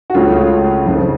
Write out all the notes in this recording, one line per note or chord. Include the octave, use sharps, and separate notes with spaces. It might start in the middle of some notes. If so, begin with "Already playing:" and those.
F#4
C#2 C#3 A3 C#4 F4
F2 C#3 F3